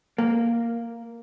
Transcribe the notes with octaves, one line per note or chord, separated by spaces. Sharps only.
A#3